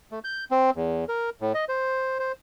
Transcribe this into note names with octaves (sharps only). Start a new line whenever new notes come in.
A3
G6
C4
E2
A#4
A2
D#5
C5
C5